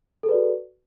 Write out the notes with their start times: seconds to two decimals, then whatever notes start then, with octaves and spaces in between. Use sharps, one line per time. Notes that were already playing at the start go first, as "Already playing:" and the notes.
0.23 A4
0.26 G#4
0.29 B4
0.31 D5
0.34 F#4